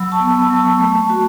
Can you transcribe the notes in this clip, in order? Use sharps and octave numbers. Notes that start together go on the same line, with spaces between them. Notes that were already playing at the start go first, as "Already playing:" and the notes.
Already playing: F#3 B5 E6
A5 C#6
B3
B5 E6
F#3
A5 C#6
A3
F#4